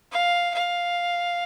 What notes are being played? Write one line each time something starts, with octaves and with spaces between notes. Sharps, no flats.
F5
F5